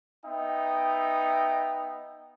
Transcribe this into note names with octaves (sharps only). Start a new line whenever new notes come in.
B3 D#4 E5 G5